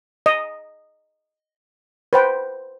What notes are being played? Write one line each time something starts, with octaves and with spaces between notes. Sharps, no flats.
D#5
B4 C5 G5